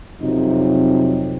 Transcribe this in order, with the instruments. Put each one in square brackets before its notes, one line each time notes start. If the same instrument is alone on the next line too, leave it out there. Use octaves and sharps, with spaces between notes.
[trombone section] F2 C3 F#3 D#4